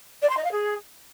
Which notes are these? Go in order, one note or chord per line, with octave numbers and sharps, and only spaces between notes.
D5
C6
D#5
F5
G#4